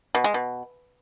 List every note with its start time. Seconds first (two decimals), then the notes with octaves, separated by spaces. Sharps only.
0.15 B2
0.24 G#3
0.34 B2